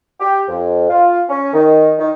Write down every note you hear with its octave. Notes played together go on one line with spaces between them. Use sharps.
G4
F2
F4
C#4
D#3
D#3